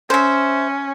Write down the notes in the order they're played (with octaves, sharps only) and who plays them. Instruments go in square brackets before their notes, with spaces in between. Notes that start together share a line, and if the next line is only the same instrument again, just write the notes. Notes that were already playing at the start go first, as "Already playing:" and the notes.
[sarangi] C#4 [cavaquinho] C5 E5